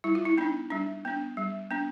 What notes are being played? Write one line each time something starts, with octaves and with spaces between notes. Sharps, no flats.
G3 E4
F4
E4
B3 D4 D#4
G3 D4
B3 D4
G3
B3 D4